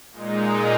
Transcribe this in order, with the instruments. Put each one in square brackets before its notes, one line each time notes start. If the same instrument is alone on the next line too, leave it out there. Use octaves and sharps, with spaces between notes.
[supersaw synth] A#2 G#3 D#4